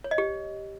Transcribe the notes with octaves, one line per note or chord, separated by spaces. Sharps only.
C#5
D#5
G4